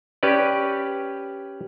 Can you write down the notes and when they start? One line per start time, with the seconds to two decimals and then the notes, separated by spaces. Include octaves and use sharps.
0.23 C#4 G4 B4 D5